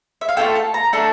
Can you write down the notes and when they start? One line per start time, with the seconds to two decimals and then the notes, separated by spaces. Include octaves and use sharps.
0.21 E5
0.29 F5
0.37 A3 C#4 F4 A4 G5
0.55 A5
0.74 A#5
0.93 A3 D4 A4 A5